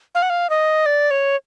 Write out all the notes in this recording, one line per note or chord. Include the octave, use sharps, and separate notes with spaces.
F5
F#5
F5
D#5
D5
C#5